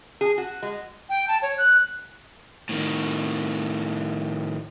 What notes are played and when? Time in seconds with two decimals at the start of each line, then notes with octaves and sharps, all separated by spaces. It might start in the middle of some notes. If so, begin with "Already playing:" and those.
0.21 G#4
0.38 F#4
0.63 G#3
1.09 G5
1.28 A5
1.42 C#5
1.58 F#6
2.69 A2 D#3